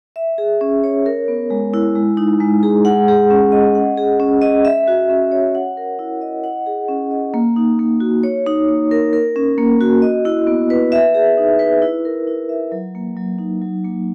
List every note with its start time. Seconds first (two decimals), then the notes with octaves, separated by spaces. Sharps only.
0.16 E5
0.38 G#4
0.61 C#4
0.84 C#5
1.06 A#4
1.28 B3
1.50 G#3
1.74 E4
1.95 G#3
2.17 D#4
2.40 G#3
2.63 G#4
2.85 F#5
3.08 G#4
3.30 C#4
3.52 D#5
3.75 F#5
3.97 G#4
4.20 C#4
4.42 D#5
4.65 E5
4.88 F#4
5.09 C#4
5.31 C#5
5.55 F#5
5.77 A#4
5.99 E4
6.21 D#5
6.44 F#5
6.66 G#4
6.88 C#4
7.11 D#5
7.34 A#3
7.56 D#4
7.79 A#3
8.00 F#4
8.23 C#5
8.46 D#4
8.68 A#3
8.91 A#4
9.13 A#4
9.36 C#4
9.58 A#3
9.81 F#4
10.02 D#5
10.25 E4
10.47 B3
10.70 B4
10.92 E5
11.15 G#4
11.37 D#4
11.59 B4
11.82 E4
12.05 A#4
12.27 E4
12.49 E5
12.72 F#3
12.95 A#3
13.17 F#3
13.39 D#4
13.62 F#3
13.85 A#3